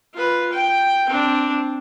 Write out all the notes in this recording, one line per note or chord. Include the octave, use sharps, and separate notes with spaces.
F4 B4
G5
C4 D4